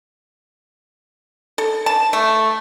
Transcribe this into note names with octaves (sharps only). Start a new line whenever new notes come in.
A4
A5
A3